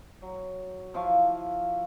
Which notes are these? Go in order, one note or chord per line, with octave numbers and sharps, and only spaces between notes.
F#3
F3 E4 F5 C#6